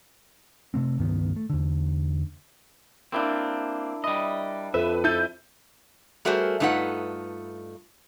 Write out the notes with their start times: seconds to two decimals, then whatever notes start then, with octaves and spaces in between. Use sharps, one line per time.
0.74 C3 A3 C4
0.98 C#2 G2 D#3 B3
1.36 A3
1.50 E2 D3
3.12 A#3 C4 D4 E4 A#4
4.04 G3 E4 D#5
4.74 F2 A4 B4 E5
5.04 E4 A4 A5 G6 D#7
6.25 G3 A3 F#4 G#4 A#4 C5
6.60 G2 A3 D#4 F4 B4 F#5